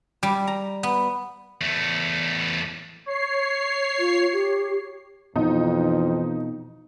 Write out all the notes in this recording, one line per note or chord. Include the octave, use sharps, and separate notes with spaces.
G3
A#5
B3
E2 A3
C#5 C7
F4
G4
F2 B2 E3 F3 D#4